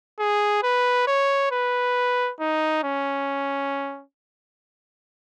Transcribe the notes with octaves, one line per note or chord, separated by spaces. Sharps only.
G#4
B4
C#5
B4
D#4
C#4